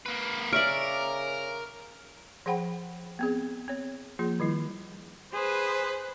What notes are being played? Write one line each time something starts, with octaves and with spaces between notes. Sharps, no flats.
A#3 B4
C#3 A#4 D5 E5 C#6 F6 D7
F3 G#4 C5 F#5 G5 B5
B3 C4 G#4
C4 C#5
F3 A#3 F4 G#4
D#3 G3 E4
G#4 B4 C5